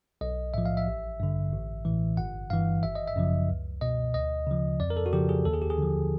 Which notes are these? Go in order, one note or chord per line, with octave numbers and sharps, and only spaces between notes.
B1 D#5
A2 F3 E5
F5
E5
A1
G2 D3
A1
A2 E3
G1 F#5
G2 E3 F5
G#1 E5
D#5
E5
F#2 C#3 F3
C#2
B2 D#5
D2 D#5
C#3 F3
F2 D5
A#4
A4
F#4
C#3 F3 G4
G#4
D#2 A4
G#4
G4
G#4
D3 F3